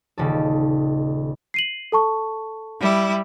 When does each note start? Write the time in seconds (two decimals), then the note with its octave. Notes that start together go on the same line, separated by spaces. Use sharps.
0.18 D#1 C#3 A4
1.54 C7 D#7 F#7
1.92 A4 A5 C#6
2.79 G3 E4